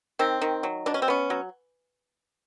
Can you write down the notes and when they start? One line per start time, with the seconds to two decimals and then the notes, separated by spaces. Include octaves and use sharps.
0.19 D#3 C4
0.41 D#3
0.63 F#3
0.86 B2 D4
0.94 C#4
1.02 C4
1.08 B3 C#4
1.30 F#3